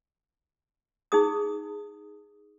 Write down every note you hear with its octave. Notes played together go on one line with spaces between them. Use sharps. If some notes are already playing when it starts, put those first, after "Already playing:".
D#4 G#4 D#6